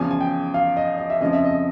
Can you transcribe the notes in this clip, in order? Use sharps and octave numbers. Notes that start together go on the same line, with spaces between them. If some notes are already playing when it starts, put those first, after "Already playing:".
Already playing: E2 C#3 F3 G#5
G#5
G5
F5
D#5
D#5
E5
F2 C#3 F3 D#5
E5
D#5